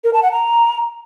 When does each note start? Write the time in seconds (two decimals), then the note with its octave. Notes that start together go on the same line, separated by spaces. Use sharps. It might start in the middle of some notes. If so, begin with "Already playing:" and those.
0.04 A#4
0.13 A5
0.23 F#5
0.32 A#5